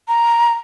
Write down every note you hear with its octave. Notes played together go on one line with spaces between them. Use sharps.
A#5